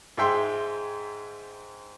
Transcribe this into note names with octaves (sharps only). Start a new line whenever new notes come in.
G#2 G#3 E5 G5 C6